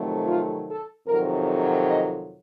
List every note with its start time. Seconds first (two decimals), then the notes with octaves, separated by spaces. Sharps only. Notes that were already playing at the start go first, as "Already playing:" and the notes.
Already playing: F2 C3 D#3 F#3 A3
0.27 F4
0.67 A4
1.07 F2 C3 D#3 F#3 A#4
1.87 D#5